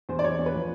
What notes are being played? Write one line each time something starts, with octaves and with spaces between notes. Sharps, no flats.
E2 C5
D5
E2 C#5
E2
B4
F3